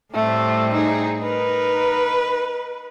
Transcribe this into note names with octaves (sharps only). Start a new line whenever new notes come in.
A2 G3 A3 C4
D#4 G#4
D#4 A#4 B4